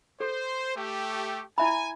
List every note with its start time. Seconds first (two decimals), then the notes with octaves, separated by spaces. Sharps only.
0.20 A4 C5
0.76 A3 G4
1.58 E4 E5 G#5 B5